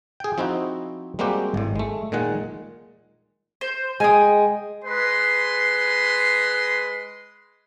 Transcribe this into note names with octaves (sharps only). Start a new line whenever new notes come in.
G#4 G5
F3 C4 D#4 E4 F#4
G3 G#3 A#3 C4 F#4 G4
G#1 A2
G#3 A3
A#2 D#3 G#3 F#5
C5
G#3 G5 G#5 D#6
G#3 B4 C6